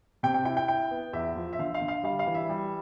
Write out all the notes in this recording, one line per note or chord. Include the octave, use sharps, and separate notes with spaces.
C3 G5
G5
E4 G5
G5
E4 G5
B3
E2 E5
F3
E5
D3 F5
F5
D3
F5
G3 F5
F5
E3
E5
G3